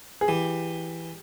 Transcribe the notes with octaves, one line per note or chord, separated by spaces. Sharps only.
G#4
E3 G4